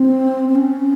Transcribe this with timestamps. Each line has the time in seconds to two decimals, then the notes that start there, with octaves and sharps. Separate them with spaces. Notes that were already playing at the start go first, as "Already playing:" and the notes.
Already playing: C4
0.49 C4
0.55 C#4